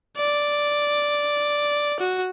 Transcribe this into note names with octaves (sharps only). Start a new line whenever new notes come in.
D5
F#4